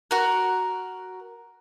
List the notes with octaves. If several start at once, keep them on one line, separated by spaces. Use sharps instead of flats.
F#4 A#4